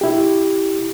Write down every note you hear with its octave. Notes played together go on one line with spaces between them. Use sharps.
E4 G4